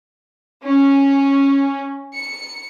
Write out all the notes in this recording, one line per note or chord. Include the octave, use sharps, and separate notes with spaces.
C#4
C#7